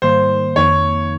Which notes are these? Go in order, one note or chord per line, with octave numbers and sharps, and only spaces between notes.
G#2 D#3 G3 A#3 C5
F2 D#3 A#3 D#4 C#5